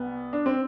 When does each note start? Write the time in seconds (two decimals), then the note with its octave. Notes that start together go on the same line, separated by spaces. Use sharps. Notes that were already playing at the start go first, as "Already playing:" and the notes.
Already playing: C2 B3
0.33 D4
0.46 C4